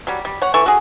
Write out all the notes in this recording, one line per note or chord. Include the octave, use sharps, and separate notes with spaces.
F#3 G3
G3
C#5 F#5
E3 A4 C#6
F#4 G#4